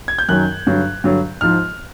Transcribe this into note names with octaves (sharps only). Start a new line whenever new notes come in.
G#6
G6
F#2 D#3 F#3 F#6
G2 D3 F#3
G2 D3 F#3
G#2 F3 F6